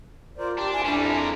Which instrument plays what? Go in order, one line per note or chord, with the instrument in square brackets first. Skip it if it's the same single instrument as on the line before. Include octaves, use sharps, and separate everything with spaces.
[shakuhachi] F4 [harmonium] A#4 C5 D5
[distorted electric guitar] D4 [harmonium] G4 G5 A5
[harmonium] E4 [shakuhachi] G#5
[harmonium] F2 E4 [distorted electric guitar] G3 C#4 [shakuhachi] D4
[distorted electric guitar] G#3 A#4